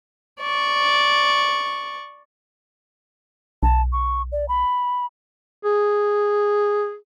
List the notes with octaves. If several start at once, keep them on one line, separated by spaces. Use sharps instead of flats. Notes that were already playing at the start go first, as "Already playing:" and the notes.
D5 C#6
B1 A5
C#6
D5
B5
G#4